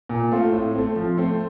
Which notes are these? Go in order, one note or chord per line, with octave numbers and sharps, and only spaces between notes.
A#2
A3 C4 F4
A2
A3 C4
F3
A3 C4